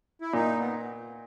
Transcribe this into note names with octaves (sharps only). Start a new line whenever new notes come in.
E4
A#2 D#4
B3